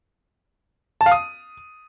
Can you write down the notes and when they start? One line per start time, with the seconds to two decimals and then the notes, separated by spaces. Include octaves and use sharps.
1.01 A5
1.06 F5
1.12 D#6